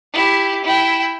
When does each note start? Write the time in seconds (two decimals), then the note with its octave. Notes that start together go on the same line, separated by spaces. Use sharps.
0.13 E4 G4
0.64 E4 G5